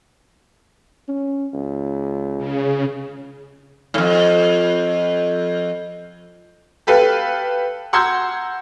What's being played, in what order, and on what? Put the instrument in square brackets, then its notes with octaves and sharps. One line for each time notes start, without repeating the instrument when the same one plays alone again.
[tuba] C#4
C#2
[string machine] C#3
[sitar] F2 A2
[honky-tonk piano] G4 A4 B4 F5
F#5 A#5 C6 E6 G6 G#6